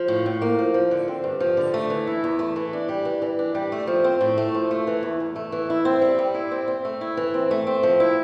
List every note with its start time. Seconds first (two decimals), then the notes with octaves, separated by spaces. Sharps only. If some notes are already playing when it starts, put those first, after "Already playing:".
Already playing: F3
0.08 A2
0.26 A2
0.42 A#3
0.59 F3
0.74 F3
0.91 D3
1.08 C4
1.24 G2
1.40 F3
1.57 D3
1.74 A3
1.90 E3
2.07 E4
2.24 E2
2.39 A3
2.56 E3
2.73 D4
2.89 G3
3.05 E3
3.22 E3
3.39 D4
3.55 G3
3.72 A3
3.87 F3
4.04 C4
4.21 A2
4.38 A3
4.54 F3
4.71 A3
4.87 E3
5.03 E2
5.20 E2
5.36 A3
5.52 E3
5.70 E4
5.85 C4
6.02 G3
6.19 G3
6.34 E4
6.51 C4
6.68 C4
6.85 A3
7.01 E4
7.17 E3
7.34 C4
7.51 A3
7.67 C4
7.83 F3
8.00 E4